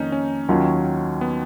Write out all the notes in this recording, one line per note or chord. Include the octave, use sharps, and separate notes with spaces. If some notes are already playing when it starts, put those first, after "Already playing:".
Already playing: F2 D#3 A#3 C#4 D#4
C#4
D#2 D#3 F#3 C#4 F4
B3